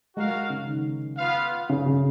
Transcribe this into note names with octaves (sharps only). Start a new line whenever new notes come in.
G#3 F#4 A#4 F5
C#3
D#3
B3 F4 B4 F5
C#3
C#3